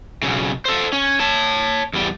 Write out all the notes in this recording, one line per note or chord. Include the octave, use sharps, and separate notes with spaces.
B1 C#3
A4 C5
C#4
C#5 A5
E2 G3